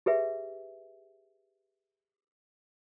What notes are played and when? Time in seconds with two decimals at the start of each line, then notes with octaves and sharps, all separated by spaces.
0.06 G4 G#4 B4 E5